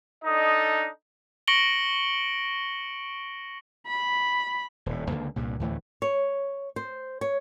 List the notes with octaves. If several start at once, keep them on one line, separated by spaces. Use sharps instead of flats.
D4 D#4 A4 D#5
C#6 A#6 C#7 D7 F#7 G7
B5
D#1 A2
C#2 D3 A#3
C2 G2 A#2
D2 A2 E3 A3
C#5
C5
C#5